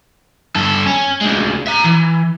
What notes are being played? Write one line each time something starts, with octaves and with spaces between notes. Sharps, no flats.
G2 A4
C#4
D2 G#3
E5 A#5
E3